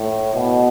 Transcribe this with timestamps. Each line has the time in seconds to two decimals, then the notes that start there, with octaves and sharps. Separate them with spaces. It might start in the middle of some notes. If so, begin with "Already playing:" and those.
Already playing: A2
0.34 B2